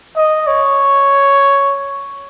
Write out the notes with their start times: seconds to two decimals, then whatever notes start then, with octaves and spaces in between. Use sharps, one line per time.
0.16 D#5
0.47 C#5